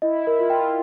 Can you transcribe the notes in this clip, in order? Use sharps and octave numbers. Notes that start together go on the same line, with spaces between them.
E4 D#5
E4 A#4
F4
G5